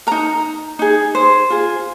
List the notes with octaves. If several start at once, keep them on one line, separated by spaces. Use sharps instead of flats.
D#4 A#4 A#5
D#4 G#4
C5
F4 G#4